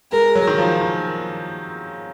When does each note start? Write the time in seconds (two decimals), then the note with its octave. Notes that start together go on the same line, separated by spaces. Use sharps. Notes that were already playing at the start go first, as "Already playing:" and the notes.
0.12 G#3 A#4
0.35 F#3
0.47 D#3
0.58 F3
0.81 D#3